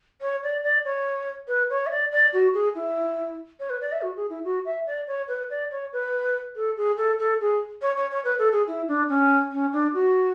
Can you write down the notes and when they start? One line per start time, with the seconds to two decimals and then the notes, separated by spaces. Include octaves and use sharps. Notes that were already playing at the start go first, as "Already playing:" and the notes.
0.22 C#5
0.43 D5
0.64 D5
0.85 C#5
1.48 B4
1.70 C#5
1.86 E5
1.91 D5
2.12 D5
2.33 F#4
2.54 G#4
2.75 E4
3.60 C#5
3.70 B4
3.81 D5
3.92 E5
4.02 F#4
4.17 G#4
4.30 E4
4.45 F#4
4.65 E5
4.87 D5
5.07 C#5
5.28 B4
5.50 D5
5.71 C#5
5.93 B4
6.56 A4
6.77 G#4
6.97 A4
7.19 A4
7.41 G#4
7.82 C#5
7.97 C#5
8.11 C#5
8.25 B4
8.39 A4
8.53 G#4
8.68 E4
8.88 D4
9.09 C#4
9.51 C#4
9.73 D4
9.94 F#4